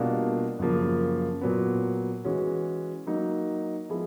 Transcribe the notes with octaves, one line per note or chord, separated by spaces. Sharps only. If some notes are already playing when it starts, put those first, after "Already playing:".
Already playing: B2 G3 A#3 D4 F4
F#2 C#3 F3 A#3
A#2 F#3 B3
E3 G#3 C#4 F#4
F#3 A#3 D#4
F3 G#3 B3 E4 G#4